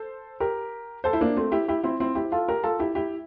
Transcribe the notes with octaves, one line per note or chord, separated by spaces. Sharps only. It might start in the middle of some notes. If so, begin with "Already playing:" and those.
Already playing: A4 C5
G4 A#4
A4 C5
E4
A#3 D4
A3 C4
E4 G4
E4 G4
C4 E4
C4 E4
E4 G4
F4 A4
G4 A#4
F4 A4
E4 G4
E4 G4